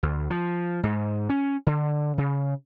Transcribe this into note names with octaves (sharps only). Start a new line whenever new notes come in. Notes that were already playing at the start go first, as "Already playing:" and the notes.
D2
F3
G#2
C#4
D3
C#3